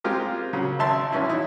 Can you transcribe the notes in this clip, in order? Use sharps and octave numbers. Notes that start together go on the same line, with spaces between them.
G#3 C4 F4 G4 A#4
C#3 F#3
G#1 E5 A5 C6
A#1 E3 C#4 E4
D#4 E4